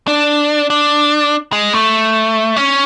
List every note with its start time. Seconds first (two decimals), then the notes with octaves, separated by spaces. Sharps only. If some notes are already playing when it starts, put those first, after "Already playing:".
0.08 D4
0.70 D4
1.52 G#3
1.73 A3
2.56 C#4